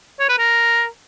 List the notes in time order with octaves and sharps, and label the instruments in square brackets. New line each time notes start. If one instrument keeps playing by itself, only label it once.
[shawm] C#5
B4
A#4